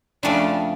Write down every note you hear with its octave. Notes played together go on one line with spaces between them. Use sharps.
F2 C#3 F3 A3 C#4 D4